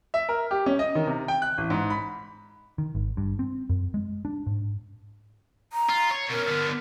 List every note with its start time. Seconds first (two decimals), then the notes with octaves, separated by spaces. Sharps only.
0.14 E5
0.29 A#4
0.51 G4
0.66 C#4
0.79 D#5
0.95 D#3
1.07 C3
1.28 G5
1.42 F#6
1.58 A1
1.70 G#2
1.90 B5
2.78 D#3
2.95 G#1
3.17 G2
3.39 C4
3.69 F#2
3.94 G#3
4.25 D4
4.46 G#2
5.73 A#5
5.89 F4
6.11 C#5
6.30 B2 C#4 A#4
6.48 D3 B3